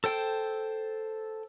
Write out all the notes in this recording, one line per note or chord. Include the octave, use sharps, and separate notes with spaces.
A4 C5 G5